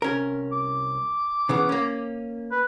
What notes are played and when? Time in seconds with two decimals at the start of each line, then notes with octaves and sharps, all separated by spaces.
0.02 C2 C#4 A#4
0.53 D6
1.49 C#3 E3 B3
1.69 A#3 C#4
2.52 B4